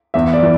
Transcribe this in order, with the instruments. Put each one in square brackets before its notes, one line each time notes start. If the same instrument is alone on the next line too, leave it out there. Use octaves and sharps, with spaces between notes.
[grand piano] E2 E5
D5
E3